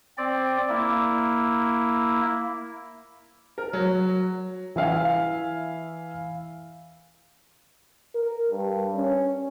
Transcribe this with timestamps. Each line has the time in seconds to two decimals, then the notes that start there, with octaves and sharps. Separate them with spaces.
0.18 C4 D5
0.69 A#3 E4
3.58 A#4
3.73 F#3
4.76 E3 E5 F5 G#5
8.15 A#4
8.51 G2
8.96 C#4